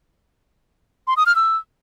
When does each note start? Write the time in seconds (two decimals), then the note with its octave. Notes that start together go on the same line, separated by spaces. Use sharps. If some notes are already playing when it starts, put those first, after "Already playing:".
1.07 C6
1.17 D#6
1.26 F6
1.36 E6